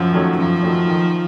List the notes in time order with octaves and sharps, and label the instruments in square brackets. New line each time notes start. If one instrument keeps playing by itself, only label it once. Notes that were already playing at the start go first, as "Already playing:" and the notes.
Already playing: [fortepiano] F#2 [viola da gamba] F3
[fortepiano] D#3 F#3 A3 C#4
[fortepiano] F#2 [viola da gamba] F3
[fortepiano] D#3 F#3 A3 C#4
D#3